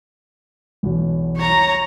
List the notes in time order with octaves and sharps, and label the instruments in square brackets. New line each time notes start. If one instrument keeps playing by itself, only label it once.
[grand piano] B1 E2 B2
[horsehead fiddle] C#5 A#5